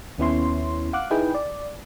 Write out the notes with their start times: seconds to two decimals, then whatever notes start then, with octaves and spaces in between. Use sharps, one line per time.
0.18 D#2 B3 C#4 E4 C#5 C6
0.93 F5 F#5 D6 F#6
1.10 D#4 E4 G#4 B4 G5
1.34 D5